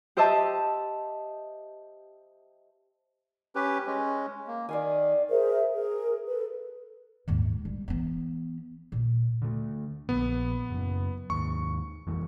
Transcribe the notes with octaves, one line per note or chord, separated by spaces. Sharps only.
G4 C5 D#5 E5 A5
C#4 G4 B4
G#3 C#4
A#3
D#3 D5 F5 G#5
G#4 A#4 C5 E5
G#4 A#4
A4 B4
D#2 G#2
G3
E3 B3
A#2
D3 A3
A#1 B3
F#1 F#2
D#2 G#2 C#6
F2 E3 G#3